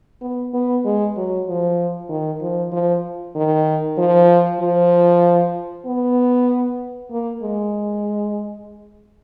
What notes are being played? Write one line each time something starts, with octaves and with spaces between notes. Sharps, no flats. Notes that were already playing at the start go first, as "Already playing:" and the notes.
B3
B3
G#3
F#3
F3
D#3
F3
F3
D#3
F3
F3
B3
A#3
G#3